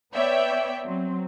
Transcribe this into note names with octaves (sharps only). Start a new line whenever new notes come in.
B3 C#5 D5 E5 G5
F#3 C4